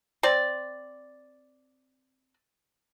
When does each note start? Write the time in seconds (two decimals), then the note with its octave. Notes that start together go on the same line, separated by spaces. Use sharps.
0.23 C4 D5